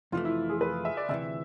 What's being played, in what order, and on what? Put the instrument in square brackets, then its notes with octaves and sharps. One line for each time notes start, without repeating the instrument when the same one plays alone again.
[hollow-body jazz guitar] F2 C3 E3 A3 [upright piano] F4
[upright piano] E4
G#4
B4
E5
D5
[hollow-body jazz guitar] D2 C3 E3 [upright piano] E5